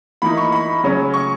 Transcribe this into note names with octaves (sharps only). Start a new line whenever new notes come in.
E3 A#3 D#4 B5
C#6
B5
C#3 F#3 C#4
C#6